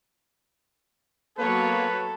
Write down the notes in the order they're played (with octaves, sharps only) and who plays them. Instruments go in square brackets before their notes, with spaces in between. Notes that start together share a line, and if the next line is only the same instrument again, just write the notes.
[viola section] F#3 B3 C#5 [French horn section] A#3 [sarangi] A4 [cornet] B4